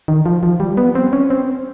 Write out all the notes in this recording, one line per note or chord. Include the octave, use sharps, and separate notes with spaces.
D#3
F3
F3
G3
B3
C4
C#4
C4